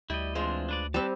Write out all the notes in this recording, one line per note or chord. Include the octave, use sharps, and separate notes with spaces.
D2 G3 E4 D#5
E3 G#3 C4 D4 F4 C5
D4 B4 D5
G3 C4 B4 A5